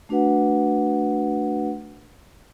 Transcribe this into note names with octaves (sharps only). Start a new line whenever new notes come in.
A3 D4 F#4 B4 F#5